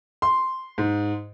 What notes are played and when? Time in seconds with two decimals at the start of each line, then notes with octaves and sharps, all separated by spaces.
0.22 C6
0.78 G#2